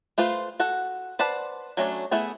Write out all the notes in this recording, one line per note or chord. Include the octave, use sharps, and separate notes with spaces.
A3 F4 B4 C5
F#4 A4 F#5
B4 C5 D5 F#5 A5
F#3 A3 C#4 D4
A3 B3 E4 G#4